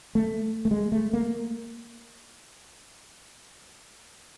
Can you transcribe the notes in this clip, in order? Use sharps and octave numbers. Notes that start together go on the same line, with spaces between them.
A3
A3
G#3
A3
A#3